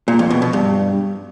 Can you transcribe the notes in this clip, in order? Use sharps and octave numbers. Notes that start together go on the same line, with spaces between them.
A#2
F2
B2
B2
G2